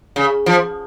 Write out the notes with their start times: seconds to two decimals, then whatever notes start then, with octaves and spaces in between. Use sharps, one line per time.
0.16 C#3
0.46 F3